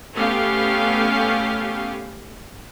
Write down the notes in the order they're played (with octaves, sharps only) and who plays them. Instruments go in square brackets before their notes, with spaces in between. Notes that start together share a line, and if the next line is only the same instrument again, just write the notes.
[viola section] A3 B3 C#4 G4 F5